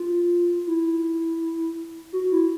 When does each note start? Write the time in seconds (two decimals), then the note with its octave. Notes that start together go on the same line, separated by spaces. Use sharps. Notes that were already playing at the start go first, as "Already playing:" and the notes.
Already playing: F4
0.67 E4
2.13 F#4
2.32 E4